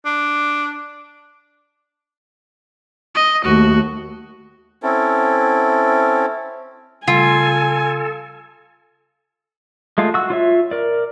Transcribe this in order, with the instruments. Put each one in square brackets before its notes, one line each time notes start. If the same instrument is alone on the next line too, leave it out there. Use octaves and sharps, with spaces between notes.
[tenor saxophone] D4
[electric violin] D#5
[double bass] D#2 A3 [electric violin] F#4
[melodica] C4 C#4 E4 A4
[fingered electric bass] C#3 G3 A3 [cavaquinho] F4 [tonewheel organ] A4 [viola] G#5
[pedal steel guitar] G#3 A3 F4
F#4 E6
F4 C#5 E5
A#4 D5